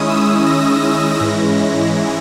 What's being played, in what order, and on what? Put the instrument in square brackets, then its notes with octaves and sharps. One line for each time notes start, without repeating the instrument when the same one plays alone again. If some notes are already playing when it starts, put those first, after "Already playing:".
Already playing: [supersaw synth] D#3 G#3 C#4 E4 D#6
E6
A#6
G#2 E3 G#3 C#4 E4